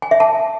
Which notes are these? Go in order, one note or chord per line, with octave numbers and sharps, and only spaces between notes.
G#5
E5
A5